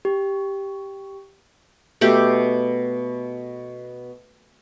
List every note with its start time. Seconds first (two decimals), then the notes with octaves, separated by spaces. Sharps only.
0.05 G4
2.01 B2 A3 G4